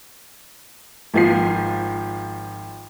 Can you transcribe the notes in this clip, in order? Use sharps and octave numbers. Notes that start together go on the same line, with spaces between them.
G#1 F3 C7